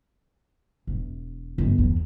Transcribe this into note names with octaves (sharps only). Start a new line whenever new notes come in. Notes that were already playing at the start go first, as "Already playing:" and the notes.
E1
G1
E2